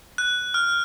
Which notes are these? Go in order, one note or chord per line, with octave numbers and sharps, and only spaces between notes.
F#6
F6